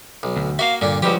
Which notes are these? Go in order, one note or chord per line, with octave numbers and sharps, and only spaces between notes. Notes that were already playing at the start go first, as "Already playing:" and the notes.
B1
D2
A#3 F#4 E5 F5
G2 A#2 D3
C#2 G2 F3 F#4 G4